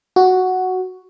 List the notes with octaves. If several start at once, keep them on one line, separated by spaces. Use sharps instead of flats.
F#4